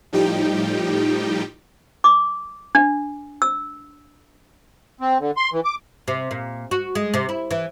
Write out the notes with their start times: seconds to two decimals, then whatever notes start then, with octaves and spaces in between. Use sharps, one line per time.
0.13 A2 F3 G3 D#4 G4 G5
2.04 D6
2.75 D4
3.42 E6
5.01 C4
5.20 D3
5.37 C6
5.53 E3
5.65 D6
6.08 C3
6.31 A#2
6.71 F#4
6.95 G#3
7.14 C3
7.29 E4
7.51 E3